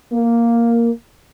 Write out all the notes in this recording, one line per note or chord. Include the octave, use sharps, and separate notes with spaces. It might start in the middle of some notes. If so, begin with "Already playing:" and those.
A#3